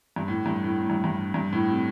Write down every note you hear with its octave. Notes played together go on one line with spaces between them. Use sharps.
G2
A2
G2
A2
A2
G2
G2
G2
A2
C3